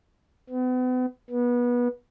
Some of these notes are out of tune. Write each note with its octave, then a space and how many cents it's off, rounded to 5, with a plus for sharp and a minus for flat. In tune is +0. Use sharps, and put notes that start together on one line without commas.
B3 +40
B3 -25